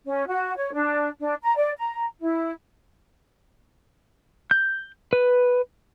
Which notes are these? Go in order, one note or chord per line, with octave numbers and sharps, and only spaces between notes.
C#4
F#4
C#5
D4
D4
A#5
D5
A#5
E4
G6
B4